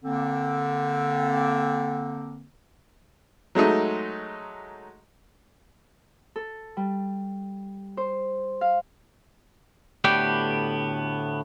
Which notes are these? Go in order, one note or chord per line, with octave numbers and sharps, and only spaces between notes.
D3 A#3 C4
F#3 G#3 A3 D#4
A4
G3
C5
F5
D2 A2 B3 G4 D5 G5